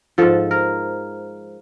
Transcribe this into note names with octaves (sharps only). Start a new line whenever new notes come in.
G#2 F3 A4
A#4